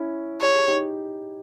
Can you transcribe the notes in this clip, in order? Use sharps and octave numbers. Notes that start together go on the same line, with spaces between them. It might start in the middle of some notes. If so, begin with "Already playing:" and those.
Already playing: C#4 E4
G4 C#5
G#4
D#4 G4